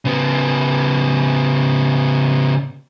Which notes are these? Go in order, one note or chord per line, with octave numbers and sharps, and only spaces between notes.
C#3 B3